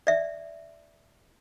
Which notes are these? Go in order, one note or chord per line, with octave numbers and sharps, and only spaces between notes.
D5 E5